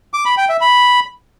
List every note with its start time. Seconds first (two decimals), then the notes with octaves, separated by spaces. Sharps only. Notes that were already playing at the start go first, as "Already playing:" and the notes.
0.14 D6
0.25 B5
0.37 G5
0.49 E5
0.61 B5